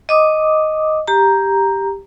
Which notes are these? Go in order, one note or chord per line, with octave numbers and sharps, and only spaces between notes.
D#5 D6 D#6
G4 A#5